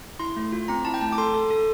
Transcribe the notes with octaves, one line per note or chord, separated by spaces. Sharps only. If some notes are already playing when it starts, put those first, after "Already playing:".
E4 C6
A3
F4
C4 A#5
E4 A5
G5
A3 A5
D6
A4 C6
A4
A4